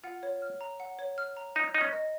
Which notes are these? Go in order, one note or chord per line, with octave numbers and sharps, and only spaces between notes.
F4 F#5
C#5
F6
A#5
F#5
C#5
F6
A#5
D#4 A#5
D#4 D#5
C#4
D#5